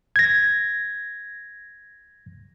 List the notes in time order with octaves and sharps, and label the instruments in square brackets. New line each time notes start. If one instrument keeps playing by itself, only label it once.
[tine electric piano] G#6 A#6